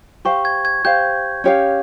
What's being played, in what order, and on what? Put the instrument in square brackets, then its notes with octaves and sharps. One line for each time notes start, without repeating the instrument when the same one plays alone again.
[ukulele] G4 C5 F5 [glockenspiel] C#6
[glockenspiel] G#6
G#6
[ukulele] G4 C5 F5 [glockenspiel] G6
[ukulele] C#4 G4 C#5 F5